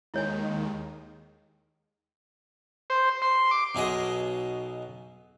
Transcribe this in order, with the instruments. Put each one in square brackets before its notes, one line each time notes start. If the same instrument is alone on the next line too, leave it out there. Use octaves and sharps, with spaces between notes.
[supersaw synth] D#2 D#3 [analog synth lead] G#3 [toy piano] E4 C#5 G#5
[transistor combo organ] C5
C6
D6
[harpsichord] B1 B2 G#4 D#5